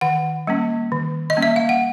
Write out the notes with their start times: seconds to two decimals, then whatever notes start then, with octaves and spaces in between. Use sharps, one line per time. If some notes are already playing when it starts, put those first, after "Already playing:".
0.01 D#3 F#5
0.47 G3 A#3 C#4
0.92 D#3
1.30 D#5
1.37 G3 A#3 C#4
1.43 E5
1.56 F5
1.69 F#5